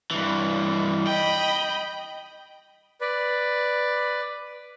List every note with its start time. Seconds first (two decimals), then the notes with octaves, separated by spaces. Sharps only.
0.11 G2 E3
1.07 D#5 G5 B5
3.01 B4 D5